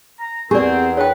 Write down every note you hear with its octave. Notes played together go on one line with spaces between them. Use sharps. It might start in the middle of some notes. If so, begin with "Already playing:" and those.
A#5
E2 B3 C4 G4 G#4 A#4 D5
D4 B4 C#5 G5